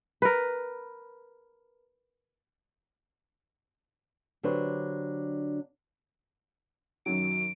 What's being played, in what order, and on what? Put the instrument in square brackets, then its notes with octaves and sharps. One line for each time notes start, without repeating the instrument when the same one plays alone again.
[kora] A#4 B4
[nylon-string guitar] D3 F#3 D4 G4 B4 C5
[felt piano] F#2 D#3 F#3 [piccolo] D7